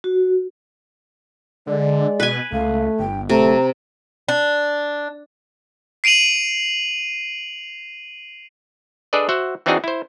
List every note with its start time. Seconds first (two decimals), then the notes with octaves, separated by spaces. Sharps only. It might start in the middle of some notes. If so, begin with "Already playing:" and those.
0.04 F#4
1.67 D3 G#3 D5
2.20 B2 B4 G#5
2.52 C#2 A3 F5
2.99 G1 G5
3.29 D1 C3 A3 A#5
4.28 D4
6.04 C7 D7 D#7 F7 F#7
9.13 D4 G#4 A4 B4 D5 D#5
9.29 F#4 C5 E5 F#5
9.66 E3 C4 D4 D#4 F#4 G#4
9.84 E4 C5